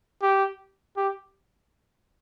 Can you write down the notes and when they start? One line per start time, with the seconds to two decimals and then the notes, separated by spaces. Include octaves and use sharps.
0.22 G4
0.97 G4